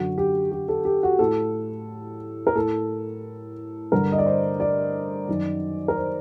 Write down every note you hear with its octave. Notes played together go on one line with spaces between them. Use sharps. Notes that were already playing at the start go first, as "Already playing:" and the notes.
Already playing: F#2 D3 F#4
G4
G4
A4
G4
F#4
A2 A4
A#4
A2 A4
G2 D3 A#4
D#5
D5
C5
D5
F#2 D#3
A#4
C5